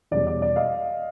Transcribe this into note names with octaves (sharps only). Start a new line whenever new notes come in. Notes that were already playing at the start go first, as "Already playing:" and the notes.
E2 B2 G3 D5
D5
D5
D#5 F5